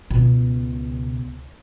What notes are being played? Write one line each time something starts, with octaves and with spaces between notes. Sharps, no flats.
C#2 B2